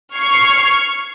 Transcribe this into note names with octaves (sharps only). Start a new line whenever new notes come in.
C#6 F6 G#6 C7 C#7